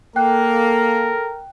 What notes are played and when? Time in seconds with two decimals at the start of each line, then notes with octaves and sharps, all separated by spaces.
0.16 A#3 A4 A#4 G5 F#6